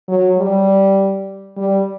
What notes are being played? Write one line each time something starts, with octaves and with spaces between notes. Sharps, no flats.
F#3
G3
G3